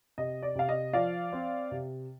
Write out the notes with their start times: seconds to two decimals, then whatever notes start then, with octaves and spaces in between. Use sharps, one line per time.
0.18 C3 D#5
0.43 D5
0.55 C3 F5
0.69 D#5
0.93 F3 D5 F5
1.33 C4
1.71 C3